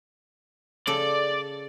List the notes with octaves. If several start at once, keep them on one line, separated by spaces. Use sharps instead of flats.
C#3 A4 D5